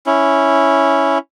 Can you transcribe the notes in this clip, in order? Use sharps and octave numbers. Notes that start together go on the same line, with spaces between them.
C#4 E4